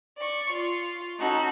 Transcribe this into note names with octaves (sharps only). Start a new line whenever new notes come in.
D5 C#6
F4
C#4 D#4 F#4 A4